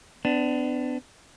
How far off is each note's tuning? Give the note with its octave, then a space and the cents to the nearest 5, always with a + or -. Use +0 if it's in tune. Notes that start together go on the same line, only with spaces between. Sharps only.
B3 +40 D4 +5